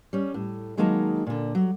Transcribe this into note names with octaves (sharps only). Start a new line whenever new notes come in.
G3 C#4
A2
D#3 F#3 G#3 A#3 D#4 A5
A#2 D3
F#3